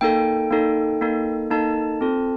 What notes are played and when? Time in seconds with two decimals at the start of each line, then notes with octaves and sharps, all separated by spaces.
0.01 A#3 D#4 A4 G5
0.51 A#3 D#4 A4
1.01 A#3 D#4 A4
1.50 A#3 D#4 A4 A5
2.01 C4 F4 A4